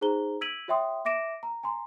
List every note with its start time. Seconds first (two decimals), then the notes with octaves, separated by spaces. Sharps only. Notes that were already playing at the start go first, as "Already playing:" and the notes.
0.01 D#4 G#4 C5 A#5 G7
0.41 E6 G#6 B6 D7 D#7 F#7
0.68 F#4 C#5 E5 G5 C6 D#6
1.05 E5 D6 A#6 D7 E7
1.43 A#5
1.63 G#5 A#5 C6